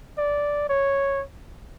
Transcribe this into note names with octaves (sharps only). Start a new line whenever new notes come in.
D5
C#5